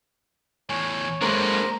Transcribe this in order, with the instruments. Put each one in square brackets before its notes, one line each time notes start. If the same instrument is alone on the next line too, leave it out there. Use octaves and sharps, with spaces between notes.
[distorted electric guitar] E2 A2 [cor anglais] C#5 [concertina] G#5
[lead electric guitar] G#3 A#3 [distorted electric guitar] D4 B4 [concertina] C5 A#5